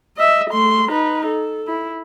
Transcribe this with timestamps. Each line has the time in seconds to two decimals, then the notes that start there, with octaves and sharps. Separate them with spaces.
0.17 D#5 E5
0.50 A3 C6
0.91 D#4 B4
1.26 A4
1.68 E4